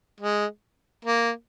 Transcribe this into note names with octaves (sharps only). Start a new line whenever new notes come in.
G#3
A#3